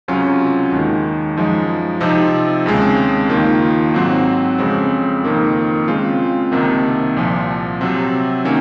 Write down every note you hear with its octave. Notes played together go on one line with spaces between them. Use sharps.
C#2 C3 F#3 C#4 F4
D#2 D#3 G#3
F#2 F3 G#3 D#4
C3 F3 C4 D#4
D#2 C#3 G#3 C4
D#2 D#3 A#3 F4
G#2 F#3 C4
F2 C#3 G#3 C4
F2 D#3 A#3 F4
C#3 G#3 C4 F4
C2 C3 D#3 A#3 D#4
C2 A#2 F3
C3 F#3 C4
D#3 A#3 C#4